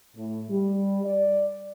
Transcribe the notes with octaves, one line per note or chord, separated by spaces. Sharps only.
A2
G3
D5